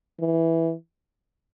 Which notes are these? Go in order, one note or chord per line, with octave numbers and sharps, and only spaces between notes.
E3